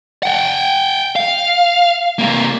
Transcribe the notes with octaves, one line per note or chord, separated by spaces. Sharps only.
F#5 G5
F5
C3 A#3